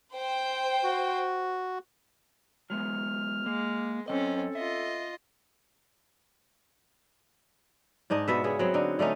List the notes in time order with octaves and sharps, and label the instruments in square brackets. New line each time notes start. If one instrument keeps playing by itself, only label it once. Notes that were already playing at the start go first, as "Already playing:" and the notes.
[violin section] C5 G5
[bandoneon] F#4
[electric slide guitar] F#3 G#3 B3 [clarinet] F6
[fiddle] G#3 [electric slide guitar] A#3
[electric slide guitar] F#2 E3 D#5 [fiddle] C4 C#4 [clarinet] A4
[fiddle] F4 D#5 [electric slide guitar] E5
[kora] G#2 D4 D#4 D#5
B2 B3 E5
C#3 B3 G#4
F#3 B3 C4
D3 D#4
D3 A3 C#4 D#4